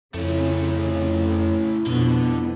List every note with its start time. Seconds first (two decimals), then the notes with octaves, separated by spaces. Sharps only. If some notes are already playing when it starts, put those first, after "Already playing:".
0.14 F2 C#3 A3 C#4 E4
1.87 F2 B2 D3 G3 B3